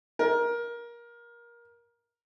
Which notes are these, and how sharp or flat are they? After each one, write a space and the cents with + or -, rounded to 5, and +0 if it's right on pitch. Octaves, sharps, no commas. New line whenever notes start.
A#4 +20